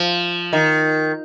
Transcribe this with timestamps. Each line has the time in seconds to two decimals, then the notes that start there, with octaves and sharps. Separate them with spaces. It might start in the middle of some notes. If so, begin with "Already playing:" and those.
Already playing: F3
0.53 D#3